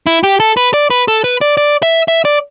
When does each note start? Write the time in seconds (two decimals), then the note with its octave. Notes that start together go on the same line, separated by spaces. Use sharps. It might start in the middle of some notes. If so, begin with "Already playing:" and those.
0.07 E4
0.23 G4
0.40 A4
0.57 B4
0.74 D5
0.90 B4
1.08 A4
1.24 B4
1.41 D5
1.57 D5
1.83 E5
2.08 E5
2.25 D5